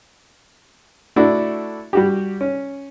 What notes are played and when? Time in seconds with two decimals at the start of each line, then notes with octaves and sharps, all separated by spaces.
1.16 A3 D4 E4 F#4
1.93 G3 F#4 G4
2.41 C#4